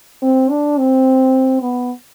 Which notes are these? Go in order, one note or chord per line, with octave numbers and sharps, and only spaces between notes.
C4
D4
C4
B3